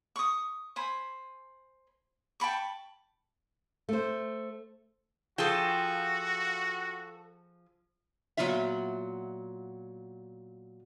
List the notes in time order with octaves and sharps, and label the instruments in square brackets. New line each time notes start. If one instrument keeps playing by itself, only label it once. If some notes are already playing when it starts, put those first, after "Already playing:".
[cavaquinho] C#6 D#6
C5 G#5 B5
G5 A5 B5 C#6
[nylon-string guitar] A3 C5
[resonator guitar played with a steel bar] F3 F4 G#4 [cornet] F#4 [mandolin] A4 G5
[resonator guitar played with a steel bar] A#2 D#3 F#3 B3 F4 E5